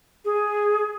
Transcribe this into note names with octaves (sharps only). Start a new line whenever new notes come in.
G#4